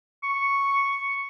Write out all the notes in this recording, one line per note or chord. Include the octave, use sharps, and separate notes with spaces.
C#6